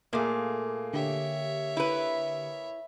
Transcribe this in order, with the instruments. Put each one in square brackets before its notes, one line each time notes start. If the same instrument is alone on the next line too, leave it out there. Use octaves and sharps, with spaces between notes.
[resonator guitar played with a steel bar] A#2 A3 [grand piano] A#3 G#4
[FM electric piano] D3 G4 [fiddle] C#5 E5
[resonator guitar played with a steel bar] E4 B4